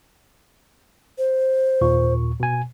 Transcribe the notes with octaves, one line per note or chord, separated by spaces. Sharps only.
C5
D#2 A#2 C#6
B2 G#5